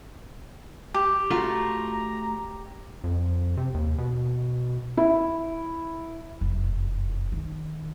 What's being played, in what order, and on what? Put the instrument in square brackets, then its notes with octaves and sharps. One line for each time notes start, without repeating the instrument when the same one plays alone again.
[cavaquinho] G4
[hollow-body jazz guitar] A3 F4 F#4 [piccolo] A#5
[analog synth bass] F2
C3
D#2
B2
[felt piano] E4
[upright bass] F1 F#2
D#3